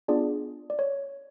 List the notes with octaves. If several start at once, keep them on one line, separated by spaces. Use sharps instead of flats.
B3 D4 F4 G#4 D5
D5
C#5